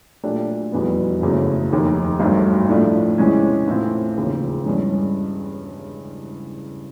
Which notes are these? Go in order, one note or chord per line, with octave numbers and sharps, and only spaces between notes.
A#2 F#3 A3 D4 G4
F1 E2 B2 G3 B3
F#1 E2 C#3 F#3 A3
F1 D#2 D#3
G#1 G2 D#3 F#3 A3
A2 F3 A3 D4
E2 C3 E3 G#3 C#4
A2 E3 A3 C4 F4
E1 D#2 C#3 F3
G2 E3 G#3 C#4